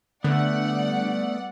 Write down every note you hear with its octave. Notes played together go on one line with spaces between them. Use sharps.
D3 G3 A3 B3 D5 F#5